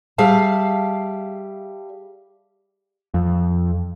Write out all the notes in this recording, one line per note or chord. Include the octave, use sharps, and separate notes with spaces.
G3 G#4 E5 F5 A5
F2